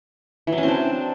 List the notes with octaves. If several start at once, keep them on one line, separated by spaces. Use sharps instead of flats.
E3
F#3
C#4
C4
D4